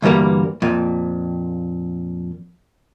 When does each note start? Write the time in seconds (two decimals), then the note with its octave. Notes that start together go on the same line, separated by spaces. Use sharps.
0.02 D2 G2 E3 G3 A#3
0.62 F2 A#2